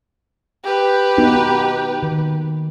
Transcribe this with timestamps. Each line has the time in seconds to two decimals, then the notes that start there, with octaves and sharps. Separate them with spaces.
0.64 G4 B4
1.18 B3 D#4 F#4
2.03 D#3